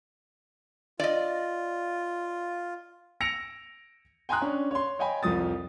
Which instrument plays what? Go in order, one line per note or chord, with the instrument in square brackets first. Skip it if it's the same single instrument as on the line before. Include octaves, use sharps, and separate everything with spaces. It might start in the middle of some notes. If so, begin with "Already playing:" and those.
[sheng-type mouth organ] F4 [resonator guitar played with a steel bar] D5 D#5
[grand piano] E6 A#6 C#7 D7 F7
G5 G#5 A#5 C6 D#6 F#6
C#4 D4
C#5 C6
C#5 D#5 G5 G#5 B5
C2 F2 F3 D#6 A6